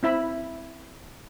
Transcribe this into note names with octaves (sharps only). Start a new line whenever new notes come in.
C4 E4 E5 B5